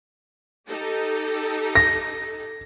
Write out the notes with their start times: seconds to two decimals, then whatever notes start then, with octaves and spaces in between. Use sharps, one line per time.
0.68 D#4 G4 A4
1.75 A#6